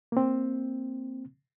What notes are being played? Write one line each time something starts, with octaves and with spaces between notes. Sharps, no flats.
A#3 C4